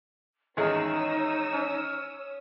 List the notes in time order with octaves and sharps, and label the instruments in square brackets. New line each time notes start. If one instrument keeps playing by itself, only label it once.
[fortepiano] G#1 E2 G#4 [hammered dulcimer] C#4 [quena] D#4 [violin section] C#5 D#6 E6
[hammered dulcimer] C#4